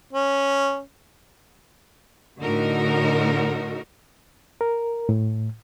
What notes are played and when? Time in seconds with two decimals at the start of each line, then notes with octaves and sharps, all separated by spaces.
0.13 C#4
2.41 A2 D3 D#4 F#4 A#4
4.61 A#4
5.09 A2